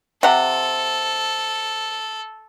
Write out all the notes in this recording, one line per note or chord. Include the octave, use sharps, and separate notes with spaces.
C3 A4 F#5